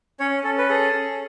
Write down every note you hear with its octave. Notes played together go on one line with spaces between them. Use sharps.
C#4 C#5
C#4 A4
B4
G#4 A4
C#4